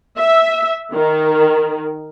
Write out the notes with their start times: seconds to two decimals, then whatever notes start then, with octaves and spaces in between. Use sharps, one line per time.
0.17 E5
0.93 D#3